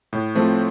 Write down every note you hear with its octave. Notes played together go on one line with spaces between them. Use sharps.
A2
F3 A3 C4